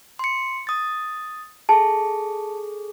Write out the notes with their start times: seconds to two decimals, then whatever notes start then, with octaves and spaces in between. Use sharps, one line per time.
0.19 C6 C#7
0.67 D#6 A6
1.69 G#4 A4 A5